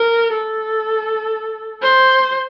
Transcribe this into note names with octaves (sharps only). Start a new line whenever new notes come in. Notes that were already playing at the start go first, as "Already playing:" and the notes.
Already playing: A#4
A4
C5